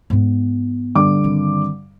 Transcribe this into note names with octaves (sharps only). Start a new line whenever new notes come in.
G#2 B3
G2 D3 D6
D#3 C4